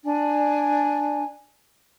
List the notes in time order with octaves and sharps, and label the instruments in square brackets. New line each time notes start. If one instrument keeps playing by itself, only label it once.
[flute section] D4 G#5